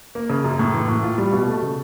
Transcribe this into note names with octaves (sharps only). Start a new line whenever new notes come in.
A#3
C#3
F#2
A2
E3
A2
F4
G3
B2
A3
C#3